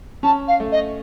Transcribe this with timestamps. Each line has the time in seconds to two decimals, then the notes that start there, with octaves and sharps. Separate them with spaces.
0.23 C#4 A5
0.47 F5
0.60 A3
0.72 D#5